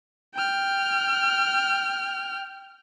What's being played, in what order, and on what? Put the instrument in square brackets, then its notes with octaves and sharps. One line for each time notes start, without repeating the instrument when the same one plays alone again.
[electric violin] G5 F6